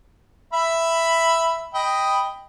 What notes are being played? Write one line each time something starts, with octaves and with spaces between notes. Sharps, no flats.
E5 B5
D#5 G5 B5